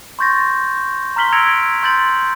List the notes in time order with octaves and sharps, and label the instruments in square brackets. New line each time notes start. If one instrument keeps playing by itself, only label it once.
[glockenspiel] C6 C#6 G6 A6 A#6
A#5 C6 F6 B6 F#7 G7
E6 G#6 A#6 C#7 D7 F7
C6 G6 A6 F#7